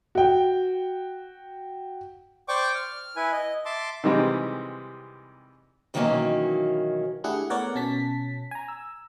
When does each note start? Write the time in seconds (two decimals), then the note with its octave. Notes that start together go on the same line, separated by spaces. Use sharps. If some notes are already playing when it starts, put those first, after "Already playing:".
0.15 F#4 G5
2.48 C5 D5 G5 C#6 D6
2.75 F6
3.16 E4 B4 G#5
3.32 D#5
3.65 E5 A5 C6 D6
4.04 C3 D#3 E3 G3 G#3 C4
5.94 B2 D#3 E3 F#3 A#3 C#4
7.24 A3 D4 E4 G4 G#4 F#5
7.50 A3 B3 A#4 C#5 D5 F#5
7.75 B2 C#4 A5 B6
8.51 G#5 A#5
8.68 E6